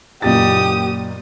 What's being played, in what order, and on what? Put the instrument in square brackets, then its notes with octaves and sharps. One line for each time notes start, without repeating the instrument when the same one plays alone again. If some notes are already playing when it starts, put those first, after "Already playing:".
[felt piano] F#1 A#2 A6 [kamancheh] G4 D#6